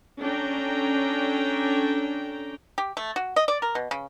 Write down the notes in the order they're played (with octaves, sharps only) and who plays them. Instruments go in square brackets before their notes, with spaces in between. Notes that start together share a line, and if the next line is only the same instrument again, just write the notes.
[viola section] C#4 D4 A4 G5 A#5
[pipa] G4
A3
F#4
D#5
D5
A#4
B2
C#3